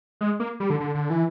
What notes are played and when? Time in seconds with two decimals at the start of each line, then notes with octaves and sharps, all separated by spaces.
0.21 G#3
0.40 A#3
0.60 G3
0.70 D3
0.80 D3
0.95 D3
1.10 E3